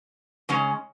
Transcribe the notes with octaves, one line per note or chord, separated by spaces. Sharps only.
C#3 G#3 C#4